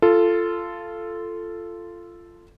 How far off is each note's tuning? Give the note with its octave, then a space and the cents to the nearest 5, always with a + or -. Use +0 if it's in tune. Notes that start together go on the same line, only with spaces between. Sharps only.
F4 -15 A4 +0